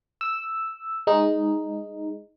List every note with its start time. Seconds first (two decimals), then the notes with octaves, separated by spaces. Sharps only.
0.21 E6
1.07 G#3 D#4